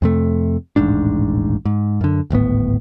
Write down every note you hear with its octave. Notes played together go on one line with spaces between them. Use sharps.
F2 C3 A3
D#1 A1 G#2 D4
G#2
F#2 D3
D1 G#1 A2 B3